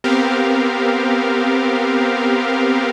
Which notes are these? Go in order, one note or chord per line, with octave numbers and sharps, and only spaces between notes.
B3 C4 G4 A#4 F5